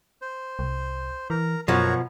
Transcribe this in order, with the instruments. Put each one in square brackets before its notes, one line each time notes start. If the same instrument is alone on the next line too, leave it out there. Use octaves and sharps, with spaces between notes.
[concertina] C5
[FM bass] C2
[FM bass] E3 [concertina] A#4
[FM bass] F#2 [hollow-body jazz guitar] B2 F3 [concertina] F#4 A#4 C#5